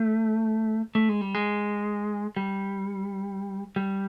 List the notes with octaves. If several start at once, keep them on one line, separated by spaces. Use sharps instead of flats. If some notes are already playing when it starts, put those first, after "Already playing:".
Already playing: A3
A3
G#3
G3
G#3
G3
G3